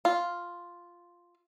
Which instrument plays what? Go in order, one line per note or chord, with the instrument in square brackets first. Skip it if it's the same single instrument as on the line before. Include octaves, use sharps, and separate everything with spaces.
[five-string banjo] F4